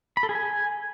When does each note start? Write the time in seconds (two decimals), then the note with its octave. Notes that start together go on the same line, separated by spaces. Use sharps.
0.17 B5
0.23 A4
0.29 G#4
0.35 G#5